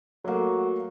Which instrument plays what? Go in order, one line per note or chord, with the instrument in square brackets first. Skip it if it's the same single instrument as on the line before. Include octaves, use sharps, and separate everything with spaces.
[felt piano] F#3 A3 A#3 [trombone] F#4